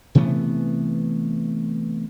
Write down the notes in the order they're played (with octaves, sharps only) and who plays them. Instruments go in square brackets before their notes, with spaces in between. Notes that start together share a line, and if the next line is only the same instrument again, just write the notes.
[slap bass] C3 E3 A3 B3